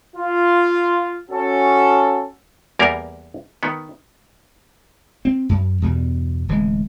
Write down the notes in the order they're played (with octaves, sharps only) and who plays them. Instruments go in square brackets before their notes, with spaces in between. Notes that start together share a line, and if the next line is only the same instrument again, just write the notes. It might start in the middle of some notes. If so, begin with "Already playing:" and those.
[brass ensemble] F4
C#4 F#4 A4
[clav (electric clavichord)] E2 G3 A#3 B3 A#4
D#3 B3
[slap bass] C4
F#2
E2 G2 B2
D1 E3 G#3